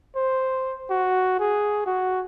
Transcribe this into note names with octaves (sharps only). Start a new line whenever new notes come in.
C5
F#4
G#4
F#4